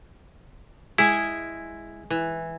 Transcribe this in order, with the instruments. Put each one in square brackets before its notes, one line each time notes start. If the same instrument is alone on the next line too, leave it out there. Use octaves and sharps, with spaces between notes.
[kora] G#3 G#4 [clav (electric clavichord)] E4
[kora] E3